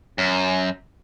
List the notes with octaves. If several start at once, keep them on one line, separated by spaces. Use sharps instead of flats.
F#2